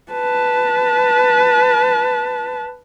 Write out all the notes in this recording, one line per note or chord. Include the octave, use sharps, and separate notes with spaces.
B4 A5